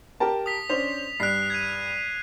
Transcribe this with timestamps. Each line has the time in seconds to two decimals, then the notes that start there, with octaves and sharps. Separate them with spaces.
0.20 G4 A#4 A5
0.46 D#6 B6
0.69 C#4 D4 C5 F7
1.20 G2 F#6 C7
1.50 G#6 D#7